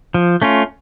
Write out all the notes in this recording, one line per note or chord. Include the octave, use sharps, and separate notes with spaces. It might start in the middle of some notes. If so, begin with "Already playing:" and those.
F3
A3 C#4 F4